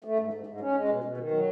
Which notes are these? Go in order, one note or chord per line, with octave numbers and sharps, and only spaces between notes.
A3
G#2
G#2
G#2
C#4
G#3
B2
B2
D#3
F#3